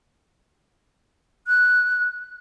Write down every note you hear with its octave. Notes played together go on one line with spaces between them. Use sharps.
F#6